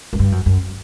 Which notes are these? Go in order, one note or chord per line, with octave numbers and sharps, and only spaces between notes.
F#2
G2
F#2
F#2